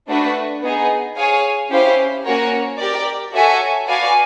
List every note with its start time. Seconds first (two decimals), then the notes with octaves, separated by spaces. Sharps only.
0.08 A3 D4 F#4 B4
0.62 B3 D#4 G#4
1.16 G#4 C#5 F5 G#5
1.70 C#4 E4 G4 C5 F5
2.24 A#3 C#4 F#4 A#4 C#5
2.78 G4 A#4 D5
3.33 F#4 A4 C#5 E5 G#5
3.87 F#4 B4 D5 F5 G#5